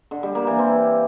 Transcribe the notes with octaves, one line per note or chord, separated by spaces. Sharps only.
D3
G3
A#3
E3
C4